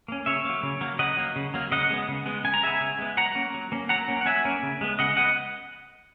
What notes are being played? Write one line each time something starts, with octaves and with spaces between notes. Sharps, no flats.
A#3 C#4
C#3 C#5 E5
F#3 A#3
C#3
F#3 A#3
C#3 D#5 F#5
F#3 A#3
C#3
F#3 A#3
C#3 D#5 F#5
G#3 B3
C#3
G#3 B3
C#3 G#5
A#5
G#3 B3 E5 G#5
C#3
G#3 B3
F#3 F#5 A#5
A#3 C#4
F#3
A#3 C#4
F#3 F#5 A#5
A#3 C#4
F#5
F#3 E5 G#5
A#3 C#4
C#3
G#3 B3
C#3 D#5 F#5
G#3 B3 D#5 F#5